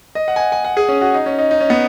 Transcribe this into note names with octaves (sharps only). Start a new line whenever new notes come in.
D#5
F#5
G#5
F#5
G#5
F#5
G#4
C#4
F#4
D#4
C#4
D#4
D#4
C#4
B3